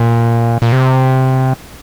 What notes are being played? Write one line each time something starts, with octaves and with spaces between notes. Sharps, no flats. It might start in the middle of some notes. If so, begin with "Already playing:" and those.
Already playing: A#2
A#2
C3